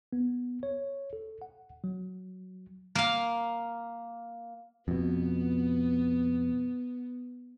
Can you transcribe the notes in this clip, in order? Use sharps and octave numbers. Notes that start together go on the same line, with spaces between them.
B3
C#5
A4
F#5
F#3
A#3 F5
F2 B2 B3